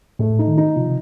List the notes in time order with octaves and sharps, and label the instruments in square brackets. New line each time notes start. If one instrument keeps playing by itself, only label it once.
[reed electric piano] A2 [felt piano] A3
[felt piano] D#4
[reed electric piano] D#3
[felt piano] D#4
[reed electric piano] C3 [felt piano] F3